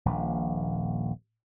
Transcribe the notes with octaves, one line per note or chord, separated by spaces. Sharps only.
D#1 A#1